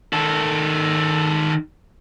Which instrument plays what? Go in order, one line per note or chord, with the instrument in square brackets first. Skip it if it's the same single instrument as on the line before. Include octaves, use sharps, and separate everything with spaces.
[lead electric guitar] D#3 A4